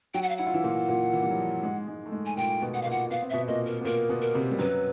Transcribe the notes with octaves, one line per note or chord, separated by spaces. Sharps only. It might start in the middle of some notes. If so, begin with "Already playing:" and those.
F#3 F#4 G5
F#5
F5
E4 F#5
F4
E3 E4
A#2 A#3
A#2 A#3
E3
G3
F#3
F3
G#2 G#3
G#2 G#3
A3
G#2 G#3
G#5
A#2 A#3 G5
B2 B3
F#5
F5
A#2 A#3 F#5
B3 F5
C4
B2 B3 E5
A#2 A#3 D#5
A#4
B3
A#2 A#3 A#4
B2 B3
A#4
C3 C4
G3
F#2 F#3 B4